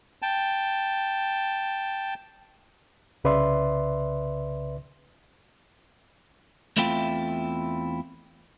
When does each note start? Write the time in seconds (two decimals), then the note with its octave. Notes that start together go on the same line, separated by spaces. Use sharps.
0.22 G5 A5
3.24 C2 C#3 B4 D5 E5 C6
6.77 E2 A3 C4 E4 F4 G5